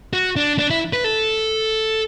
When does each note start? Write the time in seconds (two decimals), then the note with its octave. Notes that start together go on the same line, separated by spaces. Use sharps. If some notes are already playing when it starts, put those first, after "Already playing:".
0.13 F#4
0.36 D4
0.59 D4
0.70 E4
0.93 B4
1.04 A4